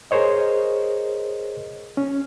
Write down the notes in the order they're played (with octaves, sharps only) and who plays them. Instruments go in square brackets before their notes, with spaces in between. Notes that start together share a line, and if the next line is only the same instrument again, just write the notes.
[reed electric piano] G#4 A#4 C5 C#5 D#5
C#4